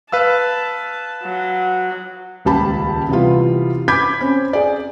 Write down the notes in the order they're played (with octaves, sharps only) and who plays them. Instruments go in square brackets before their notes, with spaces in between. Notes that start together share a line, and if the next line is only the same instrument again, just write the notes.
[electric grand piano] B4 F5 E6 [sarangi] A5
[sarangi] F#3
[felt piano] D#1 C#2 G4 A5 B5
C3 E3 G3 B3 E4 F4
B5 D6 G6 G#6 B6
C4 C#4
G#4 D5